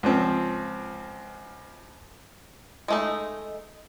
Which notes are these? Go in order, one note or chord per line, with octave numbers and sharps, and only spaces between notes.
C#2 F3 C4
G#3 A3 D#4